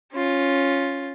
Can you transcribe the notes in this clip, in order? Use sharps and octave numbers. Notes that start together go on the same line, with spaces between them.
C#4 F4